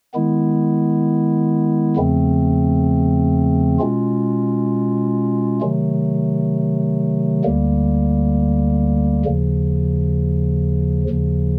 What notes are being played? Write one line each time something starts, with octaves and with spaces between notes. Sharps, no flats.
D#3 G#3 B3 E4
E2 C#3 F3 A3 C4
B2 G#3 C#4 F4
C3 D#3 F#3 A3
D2 D3 G3 A#3
D#2 C#3 F3
D#2 C#3 F3